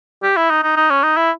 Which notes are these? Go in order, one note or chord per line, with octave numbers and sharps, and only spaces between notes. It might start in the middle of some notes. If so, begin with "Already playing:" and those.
G4
E4
D#4
D#4
D#4
C#4
D#4
E4